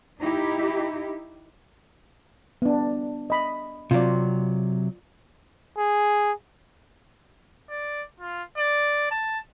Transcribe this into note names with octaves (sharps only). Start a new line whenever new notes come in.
D#4 E4 G4
B3 D4
D#5 B5
C3 F#3 F4 D5
G#4
D5
F4
D5
A5